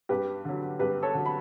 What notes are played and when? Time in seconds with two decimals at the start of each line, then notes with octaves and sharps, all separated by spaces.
0.09 G2 G4 B4
0.45 D3 F#3
0.79 G2 G4 B4
1.02 A4 C#5
1.14 D3 F#3
1.26 B5